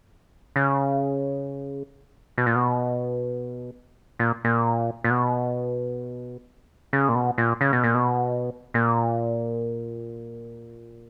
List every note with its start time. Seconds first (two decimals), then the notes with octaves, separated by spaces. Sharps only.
0.56 C#3
2.38 B2
2.46 A#2
2.55 B2
4.19 A#2
4.45 A#2
5.04 A#2
5.10 B2
6.93 C#3
7.09 A#2
7.15 B2
7.38 A#2
7.61 C#3
7.73 B2
7.84 A#2
7.95 B2
8.74 A#2